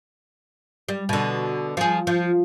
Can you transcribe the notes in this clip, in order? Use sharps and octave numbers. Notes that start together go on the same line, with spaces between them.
G3
B2 D3
F3 G#4
F3